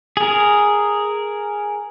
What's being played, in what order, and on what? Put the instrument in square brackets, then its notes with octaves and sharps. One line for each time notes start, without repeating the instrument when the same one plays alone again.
[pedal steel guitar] G#4 A#4